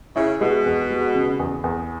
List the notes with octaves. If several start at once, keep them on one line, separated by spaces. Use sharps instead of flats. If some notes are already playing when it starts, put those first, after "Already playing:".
C#3 E4
B2 G#3
E2
G#3
C#3
E2
E2